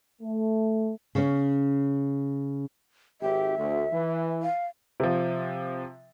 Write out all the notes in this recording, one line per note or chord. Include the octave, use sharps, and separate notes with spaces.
A3
C#3 C#4
G#1 G4 E5
D2
E3
F5
C3 F3